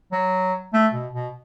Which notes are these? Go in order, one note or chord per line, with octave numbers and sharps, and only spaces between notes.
F#3
A3
B2
B2